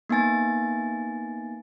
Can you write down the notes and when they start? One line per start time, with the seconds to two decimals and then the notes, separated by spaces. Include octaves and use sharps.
0.09 A#3 B3 D#4 G#5 A6